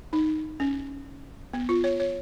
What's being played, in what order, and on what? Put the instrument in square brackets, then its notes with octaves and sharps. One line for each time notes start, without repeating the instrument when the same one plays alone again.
[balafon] D#4
C#4
B3
F4
C#5
C#5